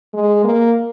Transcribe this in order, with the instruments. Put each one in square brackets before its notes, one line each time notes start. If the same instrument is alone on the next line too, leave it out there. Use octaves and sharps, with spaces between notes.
[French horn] G#3
A#3